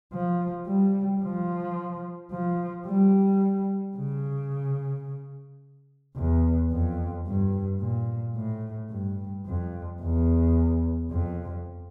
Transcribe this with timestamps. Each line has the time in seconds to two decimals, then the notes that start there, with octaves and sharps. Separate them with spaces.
0.13 F3
0.67 G3
1.22 F3
2.32 F3
2.86 G3
3.97 C#3
6.16 E2
6.72 F2
7.27 G2
7.81 A#2
8.36 A2
8.90 G2
9.46 F2
10.01 E2
11.11 F2